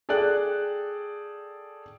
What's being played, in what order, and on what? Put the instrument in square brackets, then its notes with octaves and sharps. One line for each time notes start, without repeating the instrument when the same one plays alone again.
[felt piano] G#4 A4 D5 G5 F#6